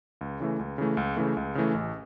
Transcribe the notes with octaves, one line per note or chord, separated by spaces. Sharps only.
C#2
C#3 E3 A3
C#2
C#3 E3 A3
C#2
C#3 E3 A3
C#2
C#3 E3 A3
A1